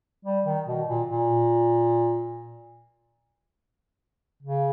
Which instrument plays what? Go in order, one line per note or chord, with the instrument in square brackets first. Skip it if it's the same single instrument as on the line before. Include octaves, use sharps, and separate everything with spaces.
[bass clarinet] G3
D#3
B2
A#2
A#2
C#3